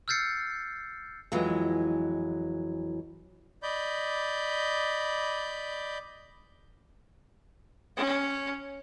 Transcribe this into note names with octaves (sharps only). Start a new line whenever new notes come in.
E6 F6 G6 A6 C7 C#7
F2 E3 F#3 G#3
D5 D#5 B5 G6
C#4